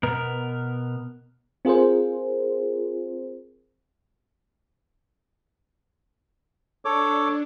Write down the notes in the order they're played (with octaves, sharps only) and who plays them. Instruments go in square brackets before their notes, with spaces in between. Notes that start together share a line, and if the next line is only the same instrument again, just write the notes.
[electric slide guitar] B2 B3 A#4
[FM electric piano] C4 F4 G#4 A#4 C5
[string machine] D4 [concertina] A4 C#5 D6